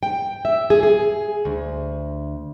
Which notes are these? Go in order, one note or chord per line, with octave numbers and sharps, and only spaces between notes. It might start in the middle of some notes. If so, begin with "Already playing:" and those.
G5
E5
G#4
G#4
D2